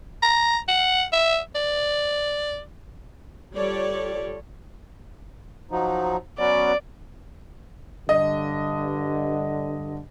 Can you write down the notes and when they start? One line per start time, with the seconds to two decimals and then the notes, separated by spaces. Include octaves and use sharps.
0.23 A#5
0.68 F#5
1.12 E5
1.55 D5
3.55 G3 F4 G4 A4 C#5 D5
5.71 F3 F#3 D#4
6.39 F#3 B3 C#4 D5
8.09 G2 D3 D#5